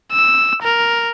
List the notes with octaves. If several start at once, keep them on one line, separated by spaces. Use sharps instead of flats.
E6
A#4